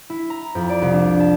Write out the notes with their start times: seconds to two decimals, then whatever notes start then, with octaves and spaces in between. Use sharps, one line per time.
0.10 E4
0.30 A#5
0.55 F2
0.69 D5
0.82 C2
0.93 D4
1.20 A5